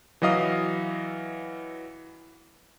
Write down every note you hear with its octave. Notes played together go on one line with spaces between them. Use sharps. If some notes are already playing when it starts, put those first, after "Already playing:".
E3 F#3 D#5 F5 D#6